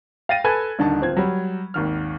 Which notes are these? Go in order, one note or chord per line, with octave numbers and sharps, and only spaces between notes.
F5 G5 A6 A#6 D#7
A4 B4 G#5 B5 F#6 G#6
D#1 D3 D#3 A5
D1 C4 F4 G#6
F#3 G3
G#1 D#2 F6